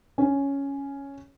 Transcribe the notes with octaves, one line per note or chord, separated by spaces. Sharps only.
C#4